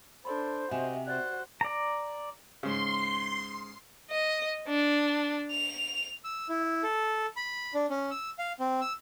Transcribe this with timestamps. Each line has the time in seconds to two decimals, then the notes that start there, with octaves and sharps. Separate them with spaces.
0.25 D4 A4 C5 B5 C6
0.71 C3 F#4 D#5 E5 G#5 E7
1.07 F#4 C5 D5 F#6 A6
1.61 D5 A#5
2.63 G#2 C#3 C6
4.11 D#5
4.67 D4
5.51 F7
6.24 E6
6.49 E4
6.83 A4
7.36 B5
7.74 D4
7.90 C#4
8.11 E6
8.39 F5
8.60 C4
8.81 E6